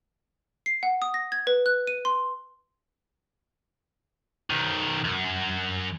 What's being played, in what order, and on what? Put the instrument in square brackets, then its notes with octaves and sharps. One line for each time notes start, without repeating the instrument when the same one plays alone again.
[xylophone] C7
F#5
D#6
A#6
G#6
B4
F#6
D#7
C6
[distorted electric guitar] B1 D#3
F#2